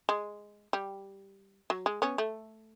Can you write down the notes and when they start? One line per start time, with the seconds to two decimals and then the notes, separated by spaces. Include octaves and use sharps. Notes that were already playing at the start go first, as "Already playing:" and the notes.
0.09 G#3
0.73 G3
1.70 F#3
1.86 G#3
2.02 B3 C#4
2.18 A3